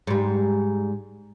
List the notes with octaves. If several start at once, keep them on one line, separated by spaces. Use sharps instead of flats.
G#2 G3